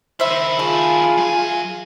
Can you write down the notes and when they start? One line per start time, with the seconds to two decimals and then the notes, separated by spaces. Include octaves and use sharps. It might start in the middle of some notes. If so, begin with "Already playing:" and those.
0.20 D#3 E4 C5 E5
0.59 A3 F4 G#4
1.18 F#3 G#5